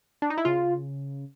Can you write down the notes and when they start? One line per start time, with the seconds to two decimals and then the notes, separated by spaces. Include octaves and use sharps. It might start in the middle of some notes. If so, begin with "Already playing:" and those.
0.22 D4
0.30 D#4
0.38 E4
0.45 C#3 F4